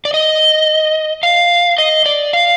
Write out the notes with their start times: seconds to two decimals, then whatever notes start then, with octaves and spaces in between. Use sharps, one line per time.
0.05 D5
0.14 D#5
1.23 F5
1.78 D#5
2.06 D5
2.33 F5